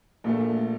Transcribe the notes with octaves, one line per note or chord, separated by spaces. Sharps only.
A#1 A#2 A3